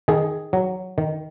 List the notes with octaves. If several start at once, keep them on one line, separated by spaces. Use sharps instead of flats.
D#3 G#4
F#3
D#3